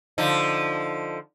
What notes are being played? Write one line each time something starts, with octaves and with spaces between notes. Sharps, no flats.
D3 F3 D#4